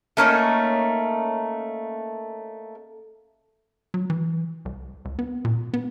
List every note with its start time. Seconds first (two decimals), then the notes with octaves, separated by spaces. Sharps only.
0.17 A3 A#3 C#4 D#4
3.94 F#3
4.10 E3
4.65 C2
5.05 C#2
5.19 B3
5.45 A#2
5.73 B3